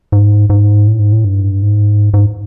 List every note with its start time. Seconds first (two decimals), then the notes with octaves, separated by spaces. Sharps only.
0.12 G#2
0.50 G#2
0.87 A2
0.99 G#2
1.13 A2
1.25 G2
1.62 G#2
2.14 G#2